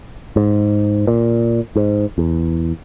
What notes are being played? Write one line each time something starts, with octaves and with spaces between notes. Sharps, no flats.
G#2
A#2
G#2
E2